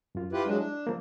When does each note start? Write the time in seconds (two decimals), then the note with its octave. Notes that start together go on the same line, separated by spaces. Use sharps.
0.15 F#2 F4
0.33 E4 F4 G4 B4
0.45 F#3 G#3 D4
0.58 D4
0.87 F3 A#3